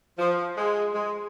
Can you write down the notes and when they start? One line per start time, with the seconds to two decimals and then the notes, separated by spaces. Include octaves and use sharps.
0.19 F3
0.57 G#3
0.94 G#3